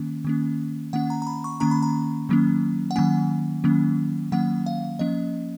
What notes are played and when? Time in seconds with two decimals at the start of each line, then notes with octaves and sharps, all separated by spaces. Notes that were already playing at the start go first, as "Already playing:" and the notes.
Already playing: D#3 A#3 C#4
0.24 D#3 A#3 C#4
0.93 D#3 A#3 C#4 F#5
1.10 A#5
1.22 A#5
1.27 B5
1.44 C#6
1.60 D#3 A#3 C#4 A#5
1.71 B5
1.83 A#5
2.29 D#3 F#3 A#3 C#4
2.91 F#5
2.96 D#3 F#3 A#3 C#4 G#5
3.64 D#3 F#3 A#3 C#4
4.32 D#3 F#3 A#3 C#4 F#5
4.66 F5
4.99 F3 A#3 C#4 D#5